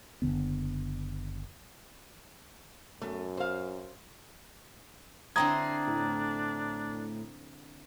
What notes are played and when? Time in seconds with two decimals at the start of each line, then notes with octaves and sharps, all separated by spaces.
0.22 F#1 F2 D3 B3
3.02 F#2 A3
3.37 C5 F5
5.36 D3 C4 D4 E4 A#5 C6 D#6 G#6
5.87 A2